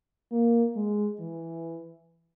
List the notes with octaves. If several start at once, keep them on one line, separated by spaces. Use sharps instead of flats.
A#3
G#3
E3